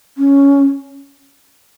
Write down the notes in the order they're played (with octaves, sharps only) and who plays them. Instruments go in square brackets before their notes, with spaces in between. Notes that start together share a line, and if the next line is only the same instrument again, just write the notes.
[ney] C#4